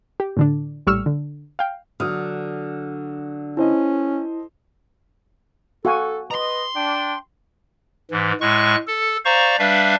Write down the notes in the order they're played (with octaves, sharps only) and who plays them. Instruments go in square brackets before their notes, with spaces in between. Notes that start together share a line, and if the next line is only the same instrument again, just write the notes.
[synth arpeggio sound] G4
A2 D3 D4
A#1 A2 G3 C#6 E6 F6
D3
F5 G5
[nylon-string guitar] D3 [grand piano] F#3 D#6 F6
[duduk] C#4 [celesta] E4 [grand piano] A4 C5 D#5
[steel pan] F#4 F5 G#5 [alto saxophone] A4
[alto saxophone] B4 [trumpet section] D#5 [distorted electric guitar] A#5 C6
[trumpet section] D4 [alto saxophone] G5
[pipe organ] G#2 E3
A2 G#3 C#6 F#6
A4
C5 D5 F5 A#5 C#6
G3 D4 B4 E5 F5